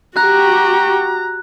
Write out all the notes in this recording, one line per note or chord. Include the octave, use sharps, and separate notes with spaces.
F#4 G4 A#5 F#6